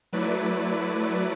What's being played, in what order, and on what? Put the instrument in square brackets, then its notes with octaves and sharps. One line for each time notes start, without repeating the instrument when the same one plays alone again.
[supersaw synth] F#3 A3 E4 B4 D5